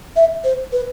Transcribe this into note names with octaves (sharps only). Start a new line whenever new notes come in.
E5
C5
B4